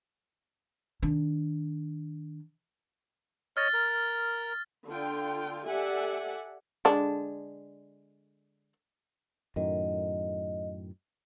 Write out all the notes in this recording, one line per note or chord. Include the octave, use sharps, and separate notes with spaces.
D#3 D4
C#5 D#5 F6 A6
A#4
D3 F4 G5
G4 A4 D5 E5 F#5 G#5
D3 G#3 D4
F#2 A2 D#3 D#5